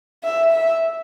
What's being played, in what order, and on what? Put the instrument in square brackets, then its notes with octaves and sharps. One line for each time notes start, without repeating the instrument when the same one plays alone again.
[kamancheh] E5
E5